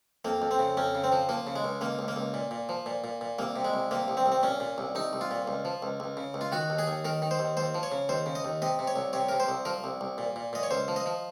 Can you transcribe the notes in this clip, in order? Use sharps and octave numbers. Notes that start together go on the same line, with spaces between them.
F2 A#3
F2
C4
C#3
F2 C#4
C#3
C4
F3
F3 A#3
C#3
G#3
C#2
C#2 A#3
C#2
A#3
C#2
A#2
A#2
F3
A#2
A#2
A#2
C2 A#3
C3
G#3
C2
C3 A#3
C2
C4
C2
C4
A#2 C#4
A#2
C2
C2 D#4
C2
F4
A#2
C#2
F3
C#2
C#2
C#3
C#2
F4
D#3 F#4
D#2
G#4
D#2
D#3 A#4
D#3
C5
D#2
D#2 C5
F3
C#5
C#3
D#2 C5
C#3
D#5
D#2
C3 D#5
C3
C#5
C2
C3 C#5
C3 A#4
C5
C2
F3 A#4
C2
C2
A#2
A#2
A#2 D#5
C#5
C#2 C5
F3
D#5
F3